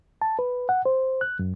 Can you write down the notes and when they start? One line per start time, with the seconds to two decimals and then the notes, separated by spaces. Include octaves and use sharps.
0.22 A5
0.39 B4
0.69 F#5
0.85 C5
1.21 F#6
1.39 F#2